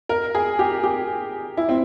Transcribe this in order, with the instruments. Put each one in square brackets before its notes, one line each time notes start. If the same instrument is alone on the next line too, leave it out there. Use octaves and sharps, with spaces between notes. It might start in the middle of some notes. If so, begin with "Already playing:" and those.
[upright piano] A#4
G#4
G4
G4
E4
C4